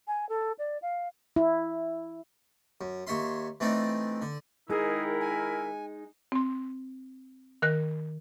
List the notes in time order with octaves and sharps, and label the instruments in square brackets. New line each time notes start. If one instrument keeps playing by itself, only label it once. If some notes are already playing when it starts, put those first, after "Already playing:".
[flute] G#5
A4
D5
F5
[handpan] E4
[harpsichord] F#2
D#2 C#5 E5 C6
E3 A3 C4 D4 D#4
D3
[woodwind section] D#3 E4 A#4 [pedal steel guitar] G#3 D#4 [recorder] G#4
[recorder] G#5
[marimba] C4 C6
D#3 A#4 F#6